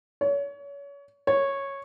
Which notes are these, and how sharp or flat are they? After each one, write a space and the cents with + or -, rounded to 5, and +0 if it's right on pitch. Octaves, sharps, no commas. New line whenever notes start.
C#5 +30
C#5 -10